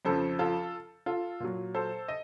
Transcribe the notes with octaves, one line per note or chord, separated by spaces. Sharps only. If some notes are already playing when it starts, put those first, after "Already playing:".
F2 C#3 F3 A4 C5
F4 A4
F4 A4
A#2 F#3
A4 C5
D#5